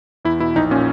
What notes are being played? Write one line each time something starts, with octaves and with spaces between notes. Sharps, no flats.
E2 E4
B2 E4
A#1 D#4
A#2 C#4